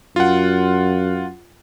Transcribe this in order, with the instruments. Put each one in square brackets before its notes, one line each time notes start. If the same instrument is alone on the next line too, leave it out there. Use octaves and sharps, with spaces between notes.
[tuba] F#2 [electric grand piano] F4 F#5